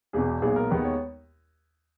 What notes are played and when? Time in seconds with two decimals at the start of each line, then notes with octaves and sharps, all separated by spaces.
0.13 E1 E2 B2 G#4
0.42 B1 A#2 G#3 B3 G#4
0.56 A#4
0.70 D#2 D#3 G#3 B3 B4
0.84 C#5